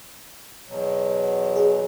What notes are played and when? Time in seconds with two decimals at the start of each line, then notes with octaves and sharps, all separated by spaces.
0.68 E2 B2 F#3
1.56 G#4